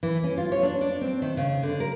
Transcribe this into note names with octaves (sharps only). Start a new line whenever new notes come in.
E3
C#4
F4
C#5
D4
D4
C4
D#3
C#3
D3
A#4